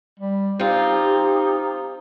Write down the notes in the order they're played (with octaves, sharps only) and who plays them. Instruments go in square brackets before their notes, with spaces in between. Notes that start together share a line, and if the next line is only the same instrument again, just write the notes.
[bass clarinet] G3
[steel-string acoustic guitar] C4 F4 [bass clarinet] D#4 [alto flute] G4